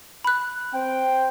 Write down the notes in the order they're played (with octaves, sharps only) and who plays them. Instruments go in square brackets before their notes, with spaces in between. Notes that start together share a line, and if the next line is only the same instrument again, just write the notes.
[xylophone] B5 F#6
[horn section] C4 C5 G5